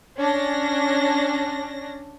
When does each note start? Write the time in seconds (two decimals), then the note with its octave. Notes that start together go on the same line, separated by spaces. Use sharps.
0.17 C#4 D4 A#6